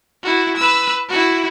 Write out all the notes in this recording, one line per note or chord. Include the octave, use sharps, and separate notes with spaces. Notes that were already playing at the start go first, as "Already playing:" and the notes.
E4 F#4
B4 E6
E4 F#4